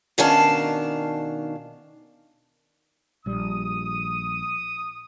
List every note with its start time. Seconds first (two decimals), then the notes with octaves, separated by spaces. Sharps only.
0.18 B2 D#3 C#4 D4 F5 A5
3.26 A#1 G3 D#6